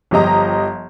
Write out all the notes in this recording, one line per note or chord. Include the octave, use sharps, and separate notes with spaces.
G1 F3 G4 D#5 A#5